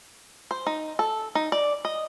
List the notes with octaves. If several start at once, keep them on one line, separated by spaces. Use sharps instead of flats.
C5
D#4
A4
D#4
D5
D#5